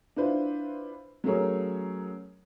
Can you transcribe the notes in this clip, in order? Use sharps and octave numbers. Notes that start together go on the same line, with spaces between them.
D4 E4 F4 B4 C5
F#3 A3 C#4 G#4 A#4 C#5